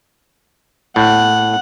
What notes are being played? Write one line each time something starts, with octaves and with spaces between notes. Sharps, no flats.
A2 F#5